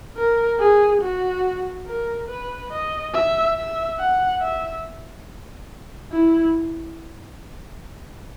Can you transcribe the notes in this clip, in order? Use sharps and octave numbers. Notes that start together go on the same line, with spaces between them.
A#4
G#4
F#4
A#4
B4
D#5
E5
E5
F#5
E5
E4